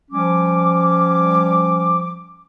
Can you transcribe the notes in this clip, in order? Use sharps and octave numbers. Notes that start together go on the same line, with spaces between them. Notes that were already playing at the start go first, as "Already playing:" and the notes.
F3 G3 C#4 D6